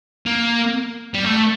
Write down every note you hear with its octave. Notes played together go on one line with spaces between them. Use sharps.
A#3
G3
A3